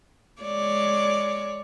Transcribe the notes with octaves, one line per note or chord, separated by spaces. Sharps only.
G#3 C#5 D5